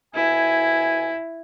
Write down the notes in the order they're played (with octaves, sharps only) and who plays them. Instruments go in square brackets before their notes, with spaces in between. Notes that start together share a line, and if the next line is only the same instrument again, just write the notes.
[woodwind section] C2 B2 G#5 [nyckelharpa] E4